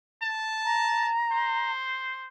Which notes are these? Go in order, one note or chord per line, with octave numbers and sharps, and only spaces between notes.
A5
A#5
C5